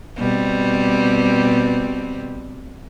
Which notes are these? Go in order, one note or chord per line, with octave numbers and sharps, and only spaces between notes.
B2 G3 C4